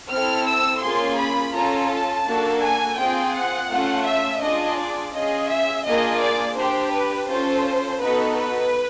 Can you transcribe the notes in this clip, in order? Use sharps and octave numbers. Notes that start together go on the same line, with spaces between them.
C4 E4 A4 F6
E6
A#3 C#4 F4 G#4 C6
B5
C#4 F4 A4 A#5
A5
A#3 D4 F#4 A4
G#5
C4 F4 G#4 G5
F#5
A3 C#4 F4
E5
D4 F4 G#4 D#5
D5
C#4 F4 G#4 D#5
E5
A#3 D4 F4 G#4 D#5
D5
D4 G4 C5
B4
C#4 F4 A4 C5
B3 D#4 F#4 A4 B4
B4